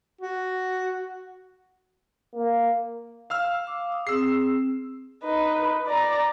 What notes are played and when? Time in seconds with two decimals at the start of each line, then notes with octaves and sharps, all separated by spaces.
0.21 F#4
2.34 A#3
3.30 F5 E6 F6
3.67 D6
3.92 D#6
4.07 C4 G#4 E6 C7
5.24 D#4 B4
5.87 D5 A#5